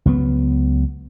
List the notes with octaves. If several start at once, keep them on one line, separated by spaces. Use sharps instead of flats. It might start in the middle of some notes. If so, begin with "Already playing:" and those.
C#2 F#3 B3